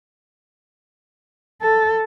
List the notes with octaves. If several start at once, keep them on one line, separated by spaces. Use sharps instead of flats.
A4